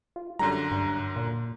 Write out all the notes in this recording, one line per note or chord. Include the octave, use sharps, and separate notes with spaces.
F4
F#2 D3 G3 A#5
G2
A#2